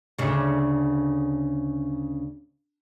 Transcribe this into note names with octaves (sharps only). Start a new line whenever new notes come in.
D2 C#3